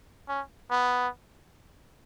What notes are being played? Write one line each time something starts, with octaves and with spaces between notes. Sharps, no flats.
C#4
B3